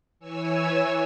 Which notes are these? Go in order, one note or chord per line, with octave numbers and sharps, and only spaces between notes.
E3 C#5 G#5 E6